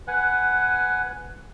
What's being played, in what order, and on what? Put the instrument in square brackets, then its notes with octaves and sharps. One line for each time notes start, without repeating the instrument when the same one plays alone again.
[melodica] B4 F#5 G#5